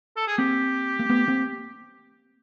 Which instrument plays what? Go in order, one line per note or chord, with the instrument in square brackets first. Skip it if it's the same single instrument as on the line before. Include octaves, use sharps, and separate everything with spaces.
[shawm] A4
G#4
[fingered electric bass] A#3 C4 [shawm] G4
[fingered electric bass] A#3
A3 B3
A#3 C4